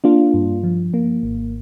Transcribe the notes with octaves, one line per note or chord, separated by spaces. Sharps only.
A#3 D4 F4
G2
F3
A#3
G#1